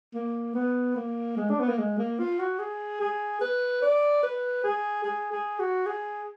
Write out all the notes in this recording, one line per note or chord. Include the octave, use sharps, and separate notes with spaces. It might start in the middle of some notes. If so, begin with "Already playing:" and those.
A#3
B3
A#3
G#3
D4
B3
A#3
G#3
A#3
F4
F#4
G#4
G#4
B4
D5
B4
G#4
G#4
G#4
F#4
G#4